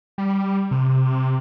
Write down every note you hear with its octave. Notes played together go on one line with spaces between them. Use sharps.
G3
C3